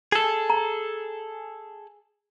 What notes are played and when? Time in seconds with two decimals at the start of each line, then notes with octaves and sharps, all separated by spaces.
0.12 G#4 A4
0.50 A#5